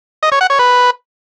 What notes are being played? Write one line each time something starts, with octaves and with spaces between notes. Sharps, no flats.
D#5
C#5
F#5
C#5
B4